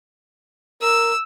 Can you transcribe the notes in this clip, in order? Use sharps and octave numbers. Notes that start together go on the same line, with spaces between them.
A#4 E6